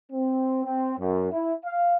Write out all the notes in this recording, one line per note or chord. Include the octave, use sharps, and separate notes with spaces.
C4
C4
F#2
E4
F5